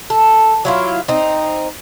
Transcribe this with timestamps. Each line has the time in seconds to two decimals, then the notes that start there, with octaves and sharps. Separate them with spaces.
0.10 A4
0.65 F#3 E4 F4
1.08 C4 D#4